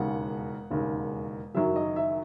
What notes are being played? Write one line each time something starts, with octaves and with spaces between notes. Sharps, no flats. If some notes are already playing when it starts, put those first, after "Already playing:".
Already playing: E1 D#2 C#3 F#5
E1 D#2 C#3
F#1 F#2 D#3 F#3 E5
D#5
E5